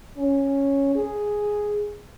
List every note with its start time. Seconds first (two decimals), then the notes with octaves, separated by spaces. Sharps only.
0.18 C#4
0.95 G#4